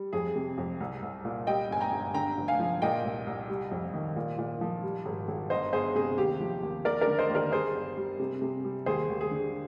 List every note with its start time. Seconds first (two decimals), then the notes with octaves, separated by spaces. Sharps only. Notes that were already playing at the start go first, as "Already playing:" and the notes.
Already playing: G3
0.13 F2 G#4
0.35 C3
0.58 F2
0.80 C2
1.02 C2
1.25 A#2
1.47 G3 D#5 G5
1.70 G1 G#5
1.81 G5 A#5
1.92 G1
2.14 D3 G5 A#5
2.37 F1
2.48 F5 G#5
2.60 F3
2.82 A#2 D#5 G5
3.05 C2
3.27 C2
3.49 G3
3.71 F2
3.94 D#3
4.16 A#2
4.38 A#2
4.61 F3
4.83 G3
5.06 G#1
5.28 G#1
5.50 G1 C5 D#5
5.73 G1 G#4 C5
5.95 C3 G#4
6.18 D#2 G4
6.40 F3
6.63 D#2
6.85 D#2 A#4 D5
7.01 A#4 D5
7.07 D3
7.19 C5 D#5
7.30 D#2
7.35 A#4 D5
7.52 G3 G#4 C5
7.75 G1
7.97 G3
8.20 C3
8.42 C3
8.64 G3
8.86 D#2 G#4 C5
9.10 D#2
9.21 G#4
9.31 D3